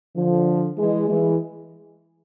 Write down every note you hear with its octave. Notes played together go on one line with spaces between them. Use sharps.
D3 F3
E3 G#3
E3 G#3